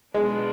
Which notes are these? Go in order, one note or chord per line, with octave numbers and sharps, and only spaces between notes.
B2 G#3 B3 D4 F4